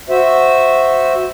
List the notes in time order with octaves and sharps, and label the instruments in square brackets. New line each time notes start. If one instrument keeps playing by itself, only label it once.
[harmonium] F#4 C5 E5